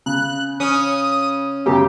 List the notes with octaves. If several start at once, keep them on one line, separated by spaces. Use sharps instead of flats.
C#3 F#6
C#4 D#6
F#2 C#3 G4